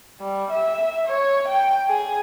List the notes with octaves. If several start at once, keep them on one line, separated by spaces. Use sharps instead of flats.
G3
E5
C#5
G5
G#4